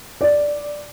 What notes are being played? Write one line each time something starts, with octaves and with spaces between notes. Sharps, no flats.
D5